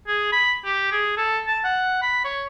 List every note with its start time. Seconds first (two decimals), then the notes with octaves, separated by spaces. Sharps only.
0.07 G#4
0.32 B5
0.65 G4
0.92 G#4
1.17 A4
1.46 A5
1.64 F#5
2.02 B5
2.24 C#5